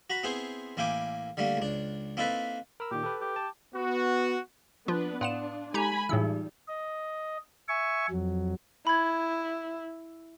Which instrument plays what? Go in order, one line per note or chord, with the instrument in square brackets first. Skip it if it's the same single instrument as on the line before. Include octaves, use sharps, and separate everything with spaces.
[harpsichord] F#4 A#5 B5
B3 C4 E4 G#4 C5
A1 A#3 E4 G5 G#5 D6
D3 G3 A3 A#3
C#2 D4
A#3 C4 D#4 E4 A4 B4
[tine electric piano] A#4 B5 E6
[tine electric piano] A#2 D#3 [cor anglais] G4
[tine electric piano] A4 B4
[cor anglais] G4
[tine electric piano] A5
[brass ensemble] B3 F#4
[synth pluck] F3 F4 [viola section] B3 D4 B4
[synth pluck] A2 F#5 E7 [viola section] D4 [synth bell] D5 F5 C6
[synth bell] G#3 [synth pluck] D#4 G4 A#5 [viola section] G#5 B5
[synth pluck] A2 E6 [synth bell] E3 D#4 G#4 [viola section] G3
[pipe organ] D#5
E5 G#5 C#6
F2 F#3
[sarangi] E4 [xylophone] B5 G#6